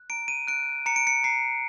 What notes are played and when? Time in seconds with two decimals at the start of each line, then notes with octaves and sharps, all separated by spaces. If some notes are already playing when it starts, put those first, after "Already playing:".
Already playing: F#6
0.10 A#5 D7
0.28 D#7
0.47 F#6 D7
0.86 A#5 C#7
0.96 D7
1.07 C#7
1.24 A#5 C7